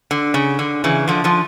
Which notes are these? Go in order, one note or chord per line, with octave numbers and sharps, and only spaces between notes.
D3
C#3
D3
C#3 E3
D3 F3
D3 F3